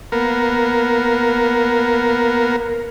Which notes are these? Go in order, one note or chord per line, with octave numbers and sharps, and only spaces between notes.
A#3 B3 A#4